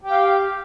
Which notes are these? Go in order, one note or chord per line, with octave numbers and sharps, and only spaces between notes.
G4 F5 G5